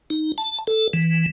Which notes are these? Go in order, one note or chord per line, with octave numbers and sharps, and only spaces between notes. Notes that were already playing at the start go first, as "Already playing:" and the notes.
D#4
A5
A4
E3